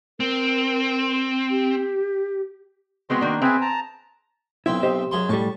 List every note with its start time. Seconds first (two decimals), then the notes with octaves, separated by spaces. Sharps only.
0.20 C4 A#4
1.50 G4
3.10 G#3 B3 C4 F#4 D#5 C6
3.21 D#3 A#3 D4
3.42 C4 G#4 B4 E5 G#5
3.61 A5 A#5
4.66 B1 C4 E4 E5
4.83 G4 C5 D#5
5.11 F#2 G#4 C6
5.29 A2 G3 A5 C#6